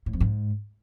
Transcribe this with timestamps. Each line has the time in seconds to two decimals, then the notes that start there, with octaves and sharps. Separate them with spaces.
0.06 A2
0.13 F2
0.20 G#2